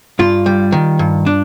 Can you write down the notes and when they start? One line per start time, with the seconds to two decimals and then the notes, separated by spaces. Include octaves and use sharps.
0.19 G2 F4
0.46 G3
0.72 D#3
0.99 G2
1.26 D4